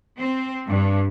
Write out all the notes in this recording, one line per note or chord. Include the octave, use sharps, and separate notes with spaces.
C4
G2